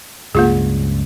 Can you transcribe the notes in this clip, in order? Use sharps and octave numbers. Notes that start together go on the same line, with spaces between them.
C#2 G2 A#3 F4 G#4